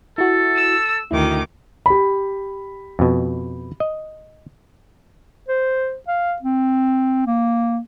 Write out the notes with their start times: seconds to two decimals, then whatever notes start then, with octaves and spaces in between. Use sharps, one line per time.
0.18 E4 F#4 A4
0.57 E6
1.11 D2 D#3 E4 D6
1.86 G4 B5
2.99 F2 B2
3.80 D#5
5.49 C5
6.08 F5
6.42 C4
7.27 A#3